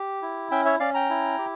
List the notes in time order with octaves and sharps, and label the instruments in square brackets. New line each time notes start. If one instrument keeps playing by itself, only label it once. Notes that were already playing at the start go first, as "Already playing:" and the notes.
Already playing: [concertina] G4
E4
C#4 E5 G5
C#5 E5
C#4 D5 F5
G5 A#5
E4
G4